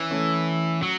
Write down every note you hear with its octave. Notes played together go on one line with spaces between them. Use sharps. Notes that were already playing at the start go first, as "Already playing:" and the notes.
Already playing: E3 C#4
A3 C#4
F#3